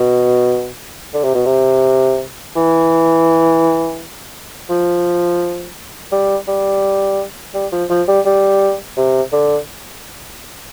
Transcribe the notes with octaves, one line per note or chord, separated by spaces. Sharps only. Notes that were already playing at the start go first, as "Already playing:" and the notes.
Already playing: B2
D3
C3
B2
C3
E3
F3
G3
G3
G3
F3
F3
G3
G3
C3
D3